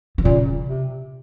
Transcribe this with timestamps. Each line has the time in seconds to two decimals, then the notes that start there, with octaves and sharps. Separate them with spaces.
0.18 D#3
0.25 A#2 C#3
0.69 C3